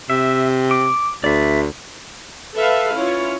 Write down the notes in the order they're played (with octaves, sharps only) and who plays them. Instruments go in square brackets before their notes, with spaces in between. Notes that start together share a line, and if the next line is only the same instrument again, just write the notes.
[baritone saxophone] C3 [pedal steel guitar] E5
[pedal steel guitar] D6
[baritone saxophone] D2 [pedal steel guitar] D5 E5
[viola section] A4 B4 E5 F5
C#4 E4 F4 C#5